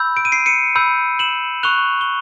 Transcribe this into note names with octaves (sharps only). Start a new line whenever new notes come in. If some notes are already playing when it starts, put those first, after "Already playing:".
Already playing: B5 E6 G6
D7
D#7
C7 D7
C#7 D#7
B5 E6 G6
E7 F#7
C#6 F#6 F7 G7
G7